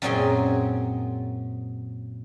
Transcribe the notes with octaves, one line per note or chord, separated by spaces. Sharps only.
F#2 A#2 C4 C#4 G#4 C6